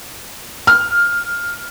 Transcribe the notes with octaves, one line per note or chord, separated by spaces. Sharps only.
F6